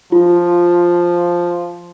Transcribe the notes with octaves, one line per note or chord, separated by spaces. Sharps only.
F3 F4